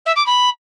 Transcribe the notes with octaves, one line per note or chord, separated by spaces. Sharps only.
E5
D6
B5